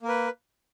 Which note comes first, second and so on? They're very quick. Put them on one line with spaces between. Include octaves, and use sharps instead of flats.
A#3 A#4 B4